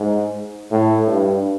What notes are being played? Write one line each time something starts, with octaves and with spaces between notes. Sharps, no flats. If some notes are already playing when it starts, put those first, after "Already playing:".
Already playing: G#2
A2
G2